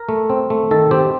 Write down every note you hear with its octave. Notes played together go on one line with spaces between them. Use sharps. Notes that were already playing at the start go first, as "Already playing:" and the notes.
Already playing: A#4
A3
C4
A3
D#3 A4
C4 G4